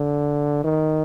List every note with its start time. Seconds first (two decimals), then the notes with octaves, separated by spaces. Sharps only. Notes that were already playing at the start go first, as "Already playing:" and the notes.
Already playing: D3
0.64 D#3